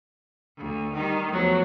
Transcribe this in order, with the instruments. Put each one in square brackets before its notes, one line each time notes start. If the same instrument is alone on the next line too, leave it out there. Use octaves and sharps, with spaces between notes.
[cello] D2
D#3 G3
[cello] E2 A3 [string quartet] F3 F#3